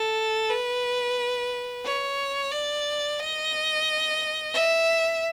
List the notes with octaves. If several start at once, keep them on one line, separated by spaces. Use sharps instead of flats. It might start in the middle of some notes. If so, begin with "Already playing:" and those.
Already playing: A4
B4
C#5
D5
D#5
E5